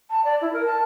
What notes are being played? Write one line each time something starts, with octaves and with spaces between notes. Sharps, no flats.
A5
D5
E4
A#4
A5